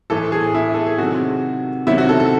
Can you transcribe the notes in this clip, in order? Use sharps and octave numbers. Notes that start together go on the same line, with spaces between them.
A2 E3 A4
G#4
E4
A4
G#4
C3 D#3 F#3 F#4
C3 D#3 F#3 E4
F#4
A4
A4